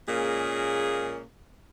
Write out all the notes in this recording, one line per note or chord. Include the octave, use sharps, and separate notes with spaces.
A#2 G#3 A#3 C#4 G#4